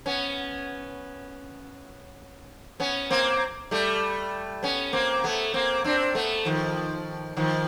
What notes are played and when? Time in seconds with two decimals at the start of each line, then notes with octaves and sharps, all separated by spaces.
0.06 B3 C#4
2.80 B3 C#4
3.10 A#3 C4
3.71 G3 A3
4.63 B3 C#4
4.93 A#3 C4
5.24 A3 B3
5.54 A#3 C4
5.84 C4 D4
6.15 A3 B3
6.45 D#3 F3
7.37 D#3 F3